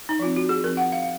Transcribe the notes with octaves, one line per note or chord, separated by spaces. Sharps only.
D#4
F3 C4 F4
F#4
G#4
F3 C4 A#4
F#5
F5
F5